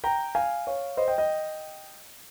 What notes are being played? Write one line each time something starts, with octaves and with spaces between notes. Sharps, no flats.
G5 A#5
F5 G#5
C#5 F5
C5 D#5
D#5 G5
D#5 G5